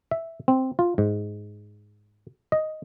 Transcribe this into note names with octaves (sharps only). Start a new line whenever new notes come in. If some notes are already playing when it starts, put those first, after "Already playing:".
E5
C4
F4
G#2
D#5